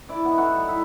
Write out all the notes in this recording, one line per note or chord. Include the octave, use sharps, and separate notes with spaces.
E4 D5
B3 D#4
F#4 A4 A#5
G3
E4 E5